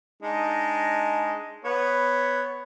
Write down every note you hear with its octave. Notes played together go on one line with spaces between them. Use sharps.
G#3 D4 D#4
B3 B4 C#5